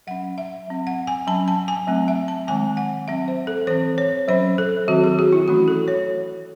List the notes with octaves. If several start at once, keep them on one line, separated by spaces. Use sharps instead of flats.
F#3 C#4 F#5
E5
F#3 C4
F#5
G#5
F#3 C#4 A5
A5
G#5
F#3 A3 C4
E5
A5
D#3 G#3 C4 G#5
F#5
F#3 C4 E5
C5
A4
E3 C4 C5
C#5
F#3 C#4 C5
A4
D#3 F#3 C4 F#4
G#4
F#4
E4
E3 A3 C#4 F#4
A4
C#5